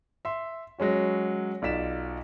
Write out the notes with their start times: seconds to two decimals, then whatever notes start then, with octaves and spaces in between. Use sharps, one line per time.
0.25 E5 C6
0.78 F#3 G#3 C#4 F#4
1.62 B1 F4 D5 B6 E7